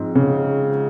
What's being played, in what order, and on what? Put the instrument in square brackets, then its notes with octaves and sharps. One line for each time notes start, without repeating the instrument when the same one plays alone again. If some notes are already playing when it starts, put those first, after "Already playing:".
Already playing: [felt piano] G#2 F3 C4
[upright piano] C#3